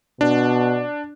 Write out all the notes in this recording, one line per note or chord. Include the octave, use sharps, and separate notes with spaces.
B2 D4